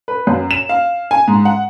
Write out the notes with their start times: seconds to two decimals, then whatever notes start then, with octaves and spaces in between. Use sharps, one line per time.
0.08 B4
0.27 F#2
0.51 E7
0.69 F5
1.11 G#5
1.28 G#2
1.45 F#5